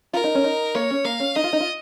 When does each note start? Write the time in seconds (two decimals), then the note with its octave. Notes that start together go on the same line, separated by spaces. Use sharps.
0.13 F4 A#4
0.24 D#4
0.35 C#4
0.44 D#4
0.75 A#3 C#5
0.90 C#4
1.05 A#3 F5
1.20 C#4
1.35 D#4 D#5
1.44 F4
1.53 D#4
1.60 F4